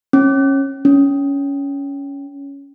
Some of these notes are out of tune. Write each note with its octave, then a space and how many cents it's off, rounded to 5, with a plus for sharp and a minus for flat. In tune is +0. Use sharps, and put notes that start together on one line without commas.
C#4 -20
C#4 +15